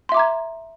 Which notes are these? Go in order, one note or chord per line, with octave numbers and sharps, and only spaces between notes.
E5 A#5 C6 D6 G#6